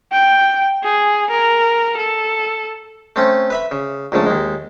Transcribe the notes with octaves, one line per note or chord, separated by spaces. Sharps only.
G5
G#4
A#4
A4
A3 C4 C#4
B4 E5 B5
C#3
A#1 G#2 C#3 A3
D#2 G#3